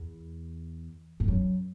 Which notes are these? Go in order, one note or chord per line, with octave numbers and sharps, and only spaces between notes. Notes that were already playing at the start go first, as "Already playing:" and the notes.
Already playing: E2
G2
F#2